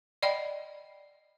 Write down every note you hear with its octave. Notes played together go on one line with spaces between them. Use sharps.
D5 D#5 F#5 G5 B5